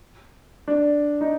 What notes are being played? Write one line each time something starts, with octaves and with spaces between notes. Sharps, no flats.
D4
D#4